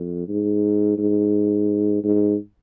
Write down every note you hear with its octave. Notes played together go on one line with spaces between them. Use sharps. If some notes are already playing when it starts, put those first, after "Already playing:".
Already playing: F2
G#2
G#2
G#2